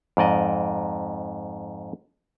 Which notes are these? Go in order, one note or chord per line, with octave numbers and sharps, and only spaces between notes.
F2 G#2 D5 D#5